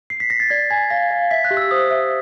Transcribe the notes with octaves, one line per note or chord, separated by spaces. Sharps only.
C7
B6
A#6
A6
D5 G#6
G#5 G#6
F5 A#6
F5
E5 B6
F#6
G4
E6
C5 D#6
E5